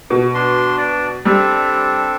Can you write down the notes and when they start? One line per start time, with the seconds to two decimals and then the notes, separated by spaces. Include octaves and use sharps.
0.10 B2
0.34 D4 C6
0.78 D4 D5
1.25 G3 C4 D4 A4